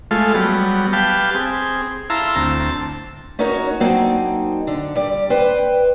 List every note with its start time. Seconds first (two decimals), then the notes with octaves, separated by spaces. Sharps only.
0.11 G#3 A3 F4 A4 F5
0.35 F#3 G3 B3
0.93 G4 B4 F5 G5 A5
1.35 C4 G#4
2.10 E4 F5 A5 A#5 C6 E6
2.36 D2 C4 A5
3.39 C#4 D#4 F#4 A#4 C#5
3.80 F#3 A#3 C4 D4 D#4
4.67 D3
4.95 G3 D5
5.30 B4 C5 G5